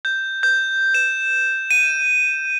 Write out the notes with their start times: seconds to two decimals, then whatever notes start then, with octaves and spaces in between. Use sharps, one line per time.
0.05 G6
0.43 G6
0.94 E7
1.71 D#7